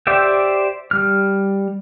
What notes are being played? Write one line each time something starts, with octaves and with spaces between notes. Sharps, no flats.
G4 C5 D5 E5 G5
G3 F6